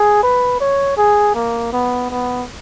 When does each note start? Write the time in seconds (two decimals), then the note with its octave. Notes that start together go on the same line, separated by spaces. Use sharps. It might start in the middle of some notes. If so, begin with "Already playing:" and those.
Already playing: G#4
0.23 B4
0.61 C#5
0.97 G#4
1.35 A#3
1.72 B3
2.11 B3